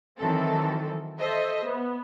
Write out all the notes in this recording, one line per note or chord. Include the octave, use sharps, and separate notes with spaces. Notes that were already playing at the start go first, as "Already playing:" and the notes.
D#3 E3 F#3 C4 A4
A4 C5 D#5 E5
B3